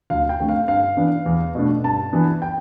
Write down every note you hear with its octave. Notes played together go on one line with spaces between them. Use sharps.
D2 F5
G5
D3 A3 C4
F5
G2 F5
E3 B3 D4
E2
B2 A3 D4
G2 A5
E3 B3 D4
G5